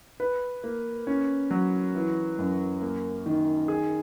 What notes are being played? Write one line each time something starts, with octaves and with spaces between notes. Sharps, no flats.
B4
A#3
C#4
F#3
E3
F#2
A#3
D#3
G#4